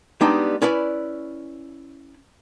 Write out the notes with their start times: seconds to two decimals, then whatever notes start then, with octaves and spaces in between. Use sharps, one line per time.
0.21 G3 G#3 B3 D4 D#4
0.62 C#4 E4 B4 D5